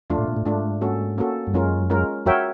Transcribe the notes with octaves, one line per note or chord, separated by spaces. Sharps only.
F2 A3 D4 F4
A2
A#2
A2
G#2 A3 D4 F4
A#3 C#4 F#4 A4
A#3 C#4 F#4 A4
G2
F#2 G#3 C#4 F4 A#4
G#3 C#4 F4 A#4
F2 F#4 A#4 C#5 E5 G5